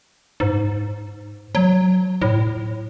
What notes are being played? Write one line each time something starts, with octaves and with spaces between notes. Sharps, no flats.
G#2
F#3
A2